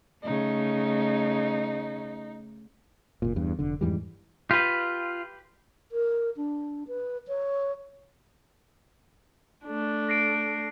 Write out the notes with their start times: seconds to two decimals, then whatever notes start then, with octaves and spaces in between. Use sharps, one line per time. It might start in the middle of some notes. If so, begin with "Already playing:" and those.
0.23 C#3 A3 D#4
3.22 F#1 A#2
3.36 E2 G2
3.59 F1 D3
3.81 F2 G#2 E3 G3
4.51 F4 G4 B4
5.92 A#4
6.37 D4
6.88 B4
7.28 C#5
9.65 A3 D4
10.09 A#6 C7 D7